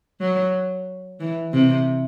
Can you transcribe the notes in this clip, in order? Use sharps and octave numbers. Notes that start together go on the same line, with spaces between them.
F#3
E3
C3